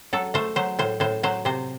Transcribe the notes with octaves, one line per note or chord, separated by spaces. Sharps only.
F#3 A4
A3 C5
F#3 C5
A2 C5
A2 C5
F#3 C5
C3 C5